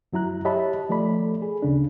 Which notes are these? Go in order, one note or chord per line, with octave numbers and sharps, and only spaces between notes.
F#2 F#3 E4 A#5 F#6
G4 C#5 D#5 E5 A5 B5
F3 A3 A4 D5 B5
G#4
D2 C#3 D4